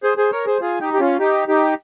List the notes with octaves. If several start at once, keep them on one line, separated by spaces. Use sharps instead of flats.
G#4 C5
G#4 C5
A#4 C#5
G#4 C5
F4 G#4
D#4 G4
G4
C#4 F4
D#4 G4
D#4 G4